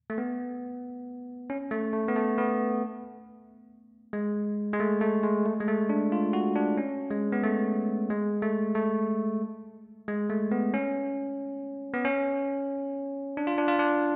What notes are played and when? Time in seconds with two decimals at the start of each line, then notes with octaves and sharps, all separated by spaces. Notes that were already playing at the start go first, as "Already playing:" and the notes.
0.10 A3
0.18 B3
1.50 C#4
1.71 A3
1.93 A3
2.08 B3
2.16 A3
2.38 B3
4.13 G#3
4.73 G#3
4.80 A3
5.01 A3
5.23 G#3
5.46 A3
5.60 G#3
5.68 A3
5.90 D4
6.12 F4
6.33 F#4
6.56 D4
6.78 C#4
7.10 G#3
7.32 B3
7.44 A3
8.10 G#3
8.42 A3
8.75 A3
10.08 G#3
10.30 A3
10.52 B3
10.74 C#4
11.94 B3
12.05 C#4
13.37 D4
13.47 F4
13.58 D4
13.68 F4
13.79 D4